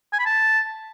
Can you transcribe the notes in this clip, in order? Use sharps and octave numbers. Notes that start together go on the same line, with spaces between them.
G#5
B5
A5